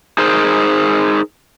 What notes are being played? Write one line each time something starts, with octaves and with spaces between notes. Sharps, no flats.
D#4 G#4 A#4 C5